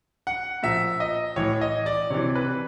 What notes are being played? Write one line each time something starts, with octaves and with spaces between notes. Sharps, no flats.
F#5
A#2 F3 E5
D#5
A2 E3 C#5
D#5
D5
C3 E3 C#5
B4